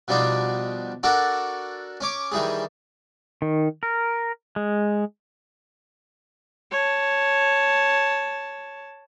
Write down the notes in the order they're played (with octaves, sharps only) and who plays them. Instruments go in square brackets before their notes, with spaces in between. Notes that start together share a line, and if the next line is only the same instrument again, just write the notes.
[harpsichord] B2 F3 G3 D4 D#4
D4 F#4 A4 A#4 F#5
C#4 C#5 D6
D#3 E3 G3 G#4
[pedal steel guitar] D#3
A#4
G#3
[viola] C#5 A5